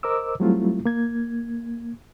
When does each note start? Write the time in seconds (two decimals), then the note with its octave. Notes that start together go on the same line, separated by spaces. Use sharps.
0.03 A#4 C5 D#5 D6 E6
0.40 F#3 G3 A3 C4 E4 F4
0.85 A#3 G#6